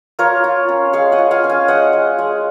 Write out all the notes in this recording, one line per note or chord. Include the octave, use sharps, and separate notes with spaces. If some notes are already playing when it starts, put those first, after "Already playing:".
F4 A#4 C#5
F4
C#4
G#3 C#5 F5
D#5 F#5
F4
F5 G#5
C#4
F5 G#5
G#3 D#5 F#5
G#3
G#3